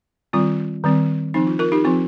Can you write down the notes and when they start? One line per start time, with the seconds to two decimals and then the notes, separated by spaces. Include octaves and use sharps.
0.33 D#3 G3 C4 F4
0.84 D#3 G3 C4
1.34 F3 C4 D#4
1.47 F4
1.59 F4 A#4
1.72 D#4 G4
1.85 F3 C4 F4